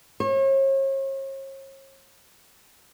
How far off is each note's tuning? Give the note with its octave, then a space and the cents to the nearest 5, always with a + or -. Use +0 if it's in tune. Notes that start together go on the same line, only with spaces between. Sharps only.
C#5 -40